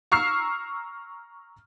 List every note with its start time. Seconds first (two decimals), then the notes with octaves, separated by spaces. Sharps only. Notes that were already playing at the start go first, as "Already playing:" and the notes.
0.12 A#5 C#6 E6 F6 C7